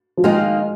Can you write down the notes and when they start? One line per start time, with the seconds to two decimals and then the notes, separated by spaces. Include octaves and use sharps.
0.17 F3
0.24 D#3 G#3 A#3 F4